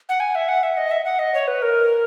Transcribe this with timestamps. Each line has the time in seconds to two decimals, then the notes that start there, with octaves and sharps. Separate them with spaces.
0.09 F#5
0.20 G#5
0.35 E5
0.48 F#5
0.63 E5
0.77 D#5
0.91 E5
1.05 F#5
1.19 D#5
1.34 C#5
1.48 B4
1.62 A#4